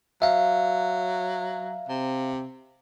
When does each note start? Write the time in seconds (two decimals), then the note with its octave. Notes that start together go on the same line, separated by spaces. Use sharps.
0.22 F#3 E5 F5
1.89 C3